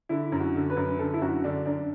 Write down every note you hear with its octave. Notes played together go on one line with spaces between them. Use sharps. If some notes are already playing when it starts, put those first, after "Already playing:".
D3 E4
F#2
F#4
D3
B4
F#2
D3 A4
E4
F#2 F#4
D3 D4
F#2 D4